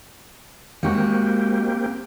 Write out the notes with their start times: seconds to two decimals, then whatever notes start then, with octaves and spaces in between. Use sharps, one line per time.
0.83 G#3 A#3 C4 F#4 G4